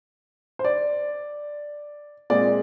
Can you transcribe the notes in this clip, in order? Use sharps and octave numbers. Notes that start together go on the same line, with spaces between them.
C5
D5
A#2 G#3 C4 D5